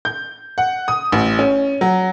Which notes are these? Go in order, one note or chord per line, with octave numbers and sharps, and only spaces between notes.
G6
F#5
D#6
A1
C#4
F#3